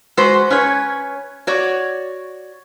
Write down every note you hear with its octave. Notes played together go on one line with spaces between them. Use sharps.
G#3 F#4 B4 C5
C#4 B4 C#5
F#4 C#5 D5